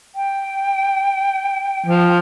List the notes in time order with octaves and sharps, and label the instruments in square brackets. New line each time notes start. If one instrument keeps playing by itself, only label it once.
[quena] G5
[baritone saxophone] F3